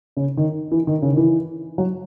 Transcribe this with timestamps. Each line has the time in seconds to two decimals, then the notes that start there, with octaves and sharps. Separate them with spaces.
0.17 C#3
0.37 D#3
0.71 E3
0.87 D#3
1.02 C#3
1.12 D#3
1.17 E3
1.78 F#3